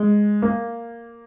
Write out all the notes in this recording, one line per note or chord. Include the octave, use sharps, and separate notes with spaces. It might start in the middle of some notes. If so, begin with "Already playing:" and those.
Already playing: G#3
A#3